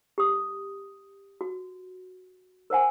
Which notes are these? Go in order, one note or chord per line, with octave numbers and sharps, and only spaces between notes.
G4 D#6
F#4
A#4 C5 F#5 G#5